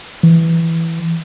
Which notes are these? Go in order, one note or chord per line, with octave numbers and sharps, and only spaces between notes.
E3